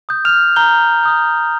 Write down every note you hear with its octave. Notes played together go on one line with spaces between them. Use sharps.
D#6 G6
F6 F7
A#5 G6 G7
D#6 G6